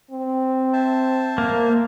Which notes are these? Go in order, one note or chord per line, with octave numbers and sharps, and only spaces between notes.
C4
C5 E5 A5
A#3